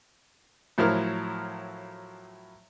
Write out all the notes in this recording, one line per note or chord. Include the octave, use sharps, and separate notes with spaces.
A2 F3 F#3 E4 A#4 F6